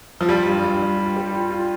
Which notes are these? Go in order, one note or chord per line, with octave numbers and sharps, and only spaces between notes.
F3
G3 F4
G2
G2
G2
F4
G3
F4
F4